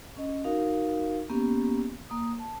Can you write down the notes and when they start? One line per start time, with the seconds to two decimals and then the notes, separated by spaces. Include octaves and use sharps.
0.17 C#4 D#5
0.44 D#4 F#4 A#4 F5
1.30 A#3 B3 C#4 G4
2.10 A#3 D#6
2.39 A5